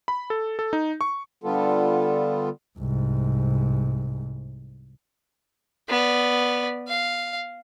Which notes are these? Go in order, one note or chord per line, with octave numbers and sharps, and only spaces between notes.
B5
A4
A4
D#4
C#6
D3 G3 B3 F4 A4
C2 G#2
B3 D5
F5